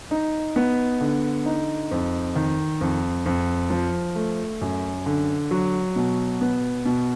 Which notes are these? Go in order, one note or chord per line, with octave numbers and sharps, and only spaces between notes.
D#4
B3
D3
D#4
F2
D#3
F2
F2
F3
A3
F#2
D3
F#3
B2
B3
B2